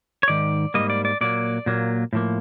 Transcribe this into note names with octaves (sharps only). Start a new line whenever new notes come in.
C#5
G#2 D#3 D5
G#2 D#3 G3 A#3 D#5
D5
D5
A#2 F#3 A#3 D5
A#2 F#3 A#3
A2 F3 A#3